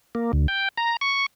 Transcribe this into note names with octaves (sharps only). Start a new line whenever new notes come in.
A#3
D2
G5
A#5
C#6